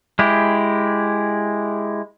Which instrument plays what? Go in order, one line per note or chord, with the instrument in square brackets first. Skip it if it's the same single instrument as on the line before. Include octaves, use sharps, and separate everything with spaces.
[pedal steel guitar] G#3 E4 G4